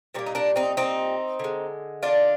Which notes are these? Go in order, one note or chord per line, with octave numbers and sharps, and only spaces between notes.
A#2 G3 A#3 C4
D#4
A#3 D4
C4 D#4
C4 D#4
D3 G#3
D4 F4